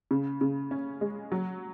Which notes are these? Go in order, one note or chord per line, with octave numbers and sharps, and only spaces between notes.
C#3
C#3
C#4
G#3
F#3